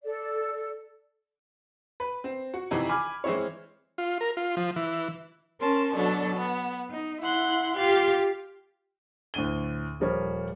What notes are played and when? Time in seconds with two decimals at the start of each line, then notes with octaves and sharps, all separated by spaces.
0.04 A4 D5
2.00 B4
2.24 C4
2.54 F#4
2.71 F2 C3 D#3 E3
2.89 G#5 B5 D6 F6
3.24 E3 G#3 C4 E4 C#5
3.98 F4
4.21 A#4
4.37 F4
4.57 F3
4.76 E3
5.60 C#4 A#4 A5 C6
5.94 B2 F#3 D4 A4
6.38 B3
6.90 D#4
7.22 E4 F#5 C6 F#6
7.76 F4 G4 F5
9.34 D2 A2 D3 D#7 G7
10.00 D#1 F3 G3 A#4 C#5